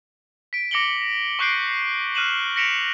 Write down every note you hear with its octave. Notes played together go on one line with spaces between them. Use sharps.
B6 D7
D6 A#6 C#7 D7 F#7 G7
C#6 D6 F#6 G6 C7 D7
F6 F#6 D#7 E7 F#7
A#6 B6 C#7 D7 E7 F7